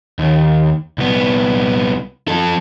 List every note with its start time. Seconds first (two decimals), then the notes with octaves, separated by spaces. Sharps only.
0.19 D#2
0.98 C2 B3
2.28 F3 A4